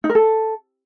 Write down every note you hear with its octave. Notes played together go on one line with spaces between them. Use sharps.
D#4
A#4
A4